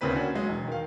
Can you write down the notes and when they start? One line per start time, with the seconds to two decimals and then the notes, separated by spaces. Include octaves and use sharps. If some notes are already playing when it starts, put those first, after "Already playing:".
0.01 D2 C#3 A#3 C4 B4 B6
0.13 A#3 C#4 D4 F#4
0.34 F#3 G#3
0.49 E1
0.67 D#3 F5